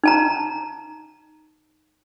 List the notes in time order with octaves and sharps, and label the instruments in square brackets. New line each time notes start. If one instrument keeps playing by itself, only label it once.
[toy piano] D#4 A5 A#5